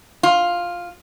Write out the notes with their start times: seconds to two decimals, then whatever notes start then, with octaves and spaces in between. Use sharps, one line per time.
0.23 F4